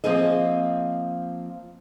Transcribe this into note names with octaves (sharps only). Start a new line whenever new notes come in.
F3 A#3 C4 G#4 D#5